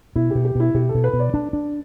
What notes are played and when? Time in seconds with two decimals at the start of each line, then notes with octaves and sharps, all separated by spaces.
0.15 B2 E4
0.31 B2 G4
0.45 G4
0.55 B2 E4
0.75 B2 G4
0.89 A4
0.95 B2
1.04 B4
1.13 B2
1.19 D5
1.34 D4
1.53 D4